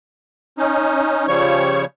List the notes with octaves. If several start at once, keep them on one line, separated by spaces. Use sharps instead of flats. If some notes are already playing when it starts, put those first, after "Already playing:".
C#4 D#4
C#3 F3 G3 C#5 C#6